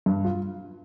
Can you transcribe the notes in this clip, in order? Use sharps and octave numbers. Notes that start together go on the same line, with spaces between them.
G2
F4